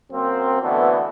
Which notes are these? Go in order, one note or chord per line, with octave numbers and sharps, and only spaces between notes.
F#2 A#3 C4
B2 D3 E3 A3 B3